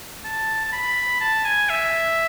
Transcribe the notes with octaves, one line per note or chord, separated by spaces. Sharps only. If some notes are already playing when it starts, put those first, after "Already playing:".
A5
A5
B5
A5
G#5
E5